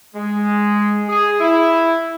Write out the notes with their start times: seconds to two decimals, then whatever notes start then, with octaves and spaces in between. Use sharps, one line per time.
0.14 G#3
1.08 G#4
1.38 E4